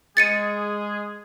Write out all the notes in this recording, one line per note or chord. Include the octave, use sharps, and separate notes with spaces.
G#3 G#4 A6 C#7 D#7